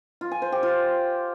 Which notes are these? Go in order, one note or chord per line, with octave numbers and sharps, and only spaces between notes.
F4
G#5
C5
G4
F4